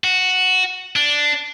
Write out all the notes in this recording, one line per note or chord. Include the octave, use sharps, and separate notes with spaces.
F#4
D4